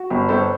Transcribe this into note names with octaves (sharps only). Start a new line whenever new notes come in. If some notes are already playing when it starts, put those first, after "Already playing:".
Already playing: F#4
G1
G1 A4 C5